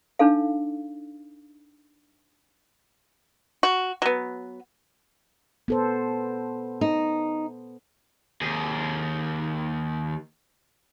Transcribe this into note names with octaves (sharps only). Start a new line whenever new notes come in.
D4 D#4 A4 F5
F#4
F#3 B3
B3 A4 C5
D#4
D#2 G#4